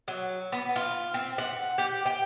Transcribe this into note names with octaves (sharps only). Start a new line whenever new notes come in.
F#3
B3
F4
C4
F#5
G4
G5